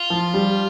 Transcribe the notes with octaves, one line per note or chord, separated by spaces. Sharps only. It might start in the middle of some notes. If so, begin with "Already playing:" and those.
Already playing: F4
F3
G3